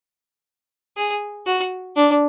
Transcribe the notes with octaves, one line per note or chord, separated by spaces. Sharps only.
G#4
F#4
D4